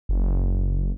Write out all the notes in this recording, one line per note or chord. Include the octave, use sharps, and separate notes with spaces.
F#1